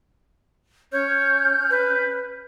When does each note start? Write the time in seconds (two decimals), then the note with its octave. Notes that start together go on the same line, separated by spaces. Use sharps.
0.92 C#4 C#5 F6 G6
1.70 B4